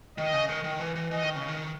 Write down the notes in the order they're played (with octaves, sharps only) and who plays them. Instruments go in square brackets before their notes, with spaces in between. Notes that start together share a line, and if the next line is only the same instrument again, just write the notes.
[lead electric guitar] D#3 [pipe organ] D#5
[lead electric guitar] C#3
D#3
D#3
E3
E3
[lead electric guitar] E3 [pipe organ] D#5
[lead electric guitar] D#3
C#3
D#3